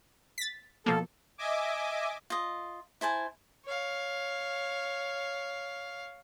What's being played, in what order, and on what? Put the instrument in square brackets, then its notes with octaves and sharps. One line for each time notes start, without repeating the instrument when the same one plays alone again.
[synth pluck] A6 B6
[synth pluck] B2 F3 A#3 [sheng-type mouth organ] A4
[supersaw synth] D#5 E5 G#5 D6
[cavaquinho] F4 D#5
E4 C5 G#5 A5
[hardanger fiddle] C#5 F5